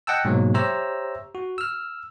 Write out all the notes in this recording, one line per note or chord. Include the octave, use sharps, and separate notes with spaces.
D#5 F#5 G5 A5 E6
G#2 B2 F#3 G#3 A#3
G4 C5 C#5 E5 A#5 E6
F#4
E6 F6